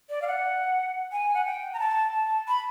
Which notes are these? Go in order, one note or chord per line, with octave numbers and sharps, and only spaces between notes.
D5
F5
F#5
G#5
F#5
G5
A#5
A5
A5
B5